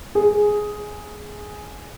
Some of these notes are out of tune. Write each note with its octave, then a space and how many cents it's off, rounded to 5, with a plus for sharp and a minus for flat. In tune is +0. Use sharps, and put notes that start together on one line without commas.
G#4 +5